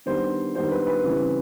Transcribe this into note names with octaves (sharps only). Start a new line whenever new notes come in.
D#3 G3 B3 D4 C5
D#3 G3 B3 D4 C5
B4
B4
C#3 E3 G3 C4